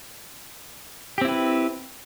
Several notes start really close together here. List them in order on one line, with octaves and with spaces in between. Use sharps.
G4 C4 E4 B4